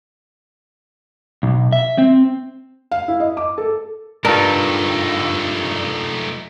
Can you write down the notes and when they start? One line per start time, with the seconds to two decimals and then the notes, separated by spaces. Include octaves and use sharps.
1.43 B1
1.72 E5
1.98 C4
2.91 F5
3.08 E4
3.20 D#5
3.37 D6
3.58 A4
4.25 G2 A3 D#4 F4 A#4